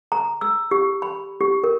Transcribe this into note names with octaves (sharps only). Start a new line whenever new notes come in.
A#5
E6
G4
B5
G4
A#4